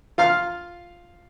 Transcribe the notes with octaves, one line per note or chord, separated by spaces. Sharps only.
F4 F5 F6